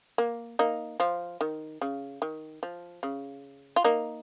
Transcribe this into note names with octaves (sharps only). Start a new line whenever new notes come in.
A#3
A#3 D#4
F3
D#3
C#3
D#3
F3
C#3
F4
A#3 D#4